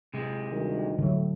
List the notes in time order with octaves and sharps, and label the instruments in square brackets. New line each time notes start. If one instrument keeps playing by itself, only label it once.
[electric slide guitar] C3 G#3
[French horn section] D2 D#3 G3
[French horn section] A2 A3 [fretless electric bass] D3 E3 F#3